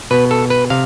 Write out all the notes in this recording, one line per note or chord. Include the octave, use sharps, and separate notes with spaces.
B2 B3 B4
A4
B4
C3 F5